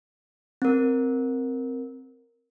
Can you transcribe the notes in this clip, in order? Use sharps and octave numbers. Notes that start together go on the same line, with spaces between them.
C4 A#4